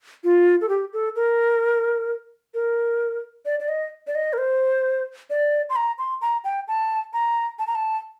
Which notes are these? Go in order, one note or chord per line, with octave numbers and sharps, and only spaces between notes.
F4
A4
G4
A4
A#4
A#4
D5
D5
D#5
D5
D#5
A#4
C5
D5
C6
A#5
C6
A#5
G5
A5
A#5
A5
A#5
A5